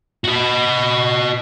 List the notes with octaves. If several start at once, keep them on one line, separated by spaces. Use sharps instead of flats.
F#4 D#5